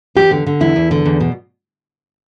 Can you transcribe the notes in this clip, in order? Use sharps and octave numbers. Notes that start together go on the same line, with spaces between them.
E2 G4
D3
D3
E2 E4
E2
D3
E2
B2